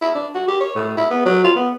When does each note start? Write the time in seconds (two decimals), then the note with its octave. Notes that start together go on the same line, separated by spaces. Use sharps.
0.02 E4
0.15 D4
0.35 F#4
0.48 G4
0.60 C#5
0.75 A2
0.97 E4
1.10 B3
1.26 F#3
1.44 F4
1.56 B3